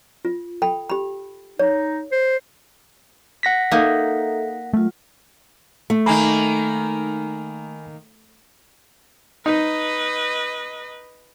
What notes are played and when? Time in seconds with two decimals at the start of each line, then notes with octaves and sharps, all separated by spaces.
0.25 F4
0.62 A4 G5 B5
0.90 G4 B5
1.59 D#4 C#5
2.12 C5
3.43 F#5 A#6 B6
3.71 A#3 D#4 A4 E5
4.73 F#3 A3 F4
5.90 A3
6.06 D#3 A#3 G#5 A#5 B5
9.46 D#4 B4 D#5